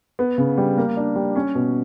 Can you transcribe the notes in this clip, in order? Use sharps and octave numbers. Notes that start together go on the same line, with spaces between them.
B3
C#3
G3
A#3
D4
G3
C#4
B2